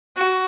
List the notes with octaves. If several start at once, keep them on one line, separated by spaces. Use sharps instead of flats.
F#4